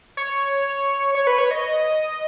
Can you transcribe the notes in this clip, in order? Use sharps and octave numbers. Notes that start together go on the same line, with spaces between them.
C#5
C#5
B4
C#5
D#5